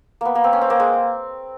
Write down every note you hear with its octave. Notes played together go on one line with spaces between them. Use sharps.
A#3 B3
A#3
C4
C#4
C4
A#3
G#3